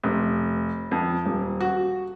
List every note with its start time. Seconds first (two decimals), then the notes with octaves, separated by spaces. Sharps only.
0.04 F1
0.91 F2
1.26 D#1
1.60 F#4